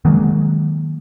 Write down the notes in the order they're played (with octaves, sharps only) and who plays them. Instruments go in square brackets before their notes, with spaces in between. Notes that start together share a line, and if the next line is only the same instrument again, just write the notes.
[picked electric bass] D#3 F#3 G#3 A#3